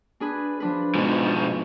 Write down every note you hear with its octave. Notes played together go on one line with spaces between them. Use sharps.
D4 G#4 B4
F3 D4 B4
G#2 B2 F3